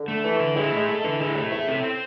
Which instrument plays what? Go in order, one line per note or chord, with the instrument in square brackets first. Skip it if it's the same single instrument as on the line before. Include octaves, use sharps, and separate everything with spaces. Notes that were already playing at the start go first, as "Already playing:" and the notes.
Already playing: [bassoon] D3
[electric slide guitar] A3
[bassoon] E3 [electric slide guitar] A4
[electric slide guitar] D3
[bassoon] G#3 [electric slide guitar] E4
[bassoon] G#3 [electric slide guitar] A3
[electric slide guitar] A4
[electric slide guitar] D3 [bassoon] E3
[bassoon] G#3 [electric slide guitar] E4
[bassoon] C3 [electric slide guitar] A3
[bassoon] E2 [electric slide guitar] E5
[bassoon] A2 [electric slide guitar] C4
[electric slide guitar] C5